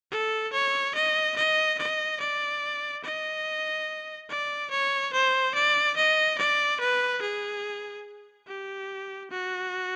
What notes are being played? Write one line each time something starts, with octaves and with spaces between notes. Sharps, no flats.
A4
C#5
D#5
D#5
D#5
D5
D#5
D5
C#5
C5
D5
D#5
D5
B4
G#4
G4
F#4